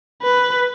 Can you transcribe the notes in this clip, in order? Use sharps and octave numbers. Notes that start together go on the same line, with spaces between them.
B4